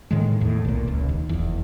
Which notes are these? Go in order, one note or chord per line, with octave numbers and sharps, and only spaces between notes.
A2 D#3 G#3
E2 A2
B1 A#2
D#1 C#2
D#2
F1 E2